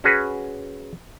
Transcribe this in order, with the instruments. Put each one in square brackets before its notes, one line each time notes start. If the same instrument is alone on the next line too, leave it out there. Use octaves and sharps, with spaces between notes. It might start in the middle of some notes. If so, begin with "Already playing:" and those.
[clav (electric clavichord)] C#4 F#4 G#4 B4